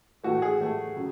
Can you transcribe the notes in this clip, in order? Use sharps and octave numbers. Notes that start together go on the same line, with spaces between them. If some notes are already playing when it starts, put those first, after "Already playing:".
A2 E3 A3 F#4
G#4
A2 E3 A3
C#3 F#3